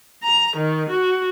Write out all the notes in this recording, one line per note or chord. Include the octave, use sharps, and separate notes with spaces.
A#5
D#3
F#4